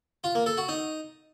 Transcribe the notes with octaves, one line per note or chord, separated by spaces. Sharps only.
F4
A#3
A4
F#4
D#4